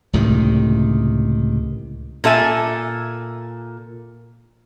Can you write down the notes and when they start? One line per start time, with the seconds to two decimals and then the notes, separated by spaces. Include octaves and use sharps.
0.13 C#2 A2 C3 D#3
2.24 A#2 A4 E5 G#5